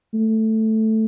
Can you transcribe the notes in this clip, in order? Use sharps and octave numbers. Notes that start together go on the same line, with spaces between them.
A3